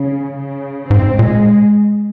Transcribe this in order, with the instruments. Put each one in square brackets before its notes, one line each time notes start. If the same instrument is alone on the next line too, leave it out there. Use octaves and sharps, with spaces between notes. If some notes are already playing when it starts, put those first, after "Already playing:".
Already playing: [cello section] C#3
C#3
[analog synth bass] G#2 [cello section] C4
[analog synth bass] A#2 [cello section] G#3